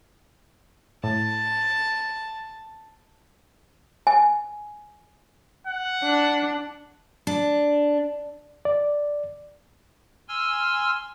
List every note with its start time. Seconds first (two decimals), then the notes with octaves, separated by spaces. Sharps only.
1.04 A2 A5
4.07 G#5
5.67 F#5
6.03 D4
7.27 D4
8.65 D5
10.28 G#5 C6 E6 F6